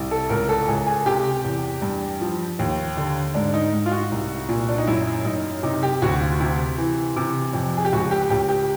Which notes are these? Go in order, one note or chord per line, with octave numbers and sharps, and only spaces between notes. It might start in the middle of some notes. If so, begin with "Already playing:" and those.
Already playing: C2
A4
C#2 A#4
A4
C#2 G#4
G#4
C3 G4
E2
G2
F3
D#2
D3
G#2 D4
D#4
G#2
F4
F#4
C2
A#2
D4
D#4
F#2 E4
F#2 D#4
C3 D#4
G4
D2 F#4
F4
C3
E3
C3
F2
G#4
G4
C#2 F#4
G4
C#2 G4
G4